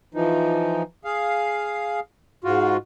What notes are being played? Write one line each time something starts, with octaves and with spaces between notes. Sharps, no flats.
E3 F3 D#4
G#4 F5
G#2 F4 F#4